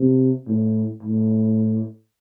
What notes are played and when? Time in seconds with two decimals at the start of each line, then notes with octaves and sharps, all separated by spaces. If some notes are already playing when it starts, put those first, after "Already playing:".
Already playing: C3
0.47 A2
1.03 A2